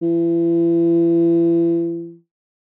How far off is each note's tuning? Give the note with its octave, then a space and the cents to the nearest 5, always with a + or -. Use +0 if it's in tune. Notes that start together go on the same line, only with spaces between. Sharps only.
E3 +35